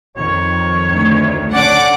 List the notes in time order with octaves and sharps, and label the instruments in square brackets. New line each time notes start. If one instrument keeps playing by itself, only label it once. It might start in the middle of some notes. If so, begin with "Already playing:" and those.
[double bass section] F2 D#3 [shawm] C#5
[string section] D2
[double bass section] D3 C#4 [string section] D4 F#5 D6 [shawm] D5